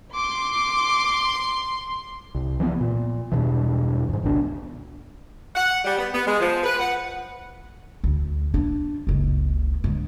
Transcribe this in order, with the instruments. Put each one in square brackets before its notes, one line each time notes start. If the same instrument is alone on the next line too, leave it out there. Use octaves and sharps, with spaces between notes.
[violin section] C6 [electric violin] D6
[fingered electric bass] C2
E3 F3 A3 B3
A#2
E2 G2 B2 E3
F2 G#2
G#1 C#2 B2 D4
[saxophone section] F#5
G3
B3
B3
G#3
F3
B4
F#5
[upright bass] D2
D4
F#1 C#2
G#2 D3